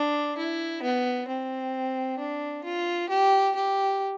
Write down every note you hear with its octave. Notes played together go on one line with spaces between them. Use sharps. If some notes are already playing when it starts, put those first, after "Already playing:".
Already playing: D4
E4
B3
C4
D4
F4
G4
G4